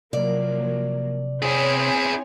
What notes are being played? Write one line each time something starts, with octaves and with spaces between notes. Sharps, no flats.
C3 F3 F#3 A#3 D5
C4 E4 G#4 C#5 G#5